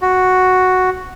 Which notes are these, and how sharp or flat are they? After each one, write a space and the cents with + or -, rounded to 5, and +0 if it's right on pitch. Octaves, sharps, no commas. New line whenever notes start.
F#4 +0